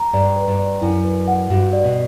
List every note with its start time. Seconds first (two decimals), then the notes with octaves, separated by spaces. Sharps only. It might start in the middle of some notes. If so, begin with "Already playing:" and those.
Already playing: A#5
0.13 G2 D5
0.36 B4
0.48 G2
0.59 D5
0.82 F#2 E4
1.05 B4
1.28 F#5
1.50 G2 F#4
1.73 D5
1.84 B2